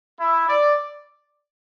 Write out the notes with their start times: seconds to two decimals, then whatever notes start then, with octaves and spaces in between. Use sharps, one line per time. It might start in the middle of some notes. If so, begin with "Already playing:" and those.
0.19 E4
0.48 D5